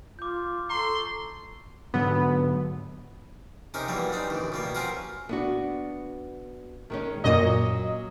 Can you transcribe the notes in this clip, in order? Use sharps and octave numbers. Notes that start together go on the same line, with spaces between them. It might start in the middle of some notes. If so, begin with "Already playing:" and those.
F4 D6 G6
A4 A#5 C6 C#6
G#2 D3 F#3 B3
C3 C#4 D#4 A#4
E2 G2 F#3 G3 A#3
G2 C4 D4 D#4
A1 D2 D#3
B2 G3 A#3
C4 C#4 F4 F#4 A#4
B3 D4 F#4
D#3 G#3 C#4
F#2 A#2 F#3 A#3 D#5